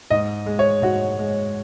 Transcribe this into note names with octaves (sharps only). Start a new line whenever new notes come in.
G#2 D#5
G#3
C#5
G#2 F#4
G#3